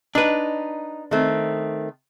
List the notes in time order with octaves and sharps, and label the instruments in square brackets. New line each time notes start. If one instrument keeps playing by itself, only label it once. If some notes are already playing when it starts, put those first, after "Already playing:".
[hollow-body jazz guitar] D4 B4 [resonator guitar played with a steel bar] D#4
[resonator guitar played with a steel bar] D#3 A3 C4